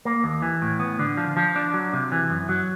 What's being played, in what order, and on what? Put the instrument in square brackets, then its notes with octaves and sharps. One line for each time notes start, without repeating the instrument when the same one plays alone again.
[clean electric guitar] A#3
D#2
E3
A2
B3
D3
F3
F3
D4
F#3
C3
E3
F#2
F#3